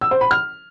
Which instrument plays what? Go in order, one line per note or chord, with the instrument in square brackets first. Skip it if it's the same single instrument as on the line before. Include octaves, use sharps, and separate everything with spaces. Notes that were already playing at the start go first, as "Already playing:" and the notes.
[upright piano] E6
C5
B5
F6